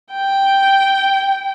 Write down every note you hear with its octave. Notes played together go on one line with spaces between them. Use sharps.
G5